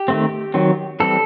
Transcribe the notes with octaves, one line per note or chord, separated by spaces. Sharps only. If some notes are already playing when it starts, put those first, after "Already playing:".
Already playing: G4
D#3 A3 C4
D#3 F#3 C4
E3 G3 C4 A4